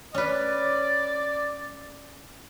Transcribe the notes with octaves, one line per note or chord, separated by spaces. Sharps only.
C#4 B4 D5